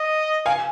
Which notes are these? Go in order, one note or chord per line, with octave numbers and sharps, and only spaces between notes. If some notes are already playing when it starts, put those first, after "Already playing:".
Already playing: D#5
F5 G#5